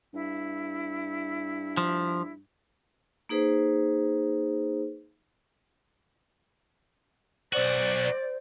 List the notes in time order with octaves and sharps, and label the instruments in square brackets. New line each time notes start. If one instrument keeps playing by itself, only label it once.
[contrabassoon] G2 [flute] E4
[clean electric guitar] F3
[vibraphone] A#3 D#4 G#4 B4 C5
[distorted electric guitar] B1 F#4 [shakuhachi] C5 [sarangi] D5